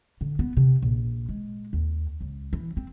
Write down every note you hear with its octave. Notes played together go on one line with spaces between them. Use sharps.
D3
B3
C3
A#1
G#3
D#2
C#2
E3
C4